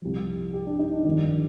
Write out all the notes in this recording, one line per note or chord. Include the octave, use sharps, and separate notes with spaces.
C2 C3 F3
G4
D4
D#4
D4
G1 F2 D#3